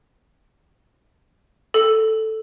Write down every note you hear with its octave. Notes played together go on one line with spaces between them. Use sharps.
A4